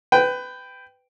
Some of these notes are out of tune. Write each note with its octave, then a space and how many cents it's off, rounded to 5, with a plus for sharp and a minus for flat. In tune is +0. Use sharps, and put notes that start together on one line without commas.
B4 +20 G5 +0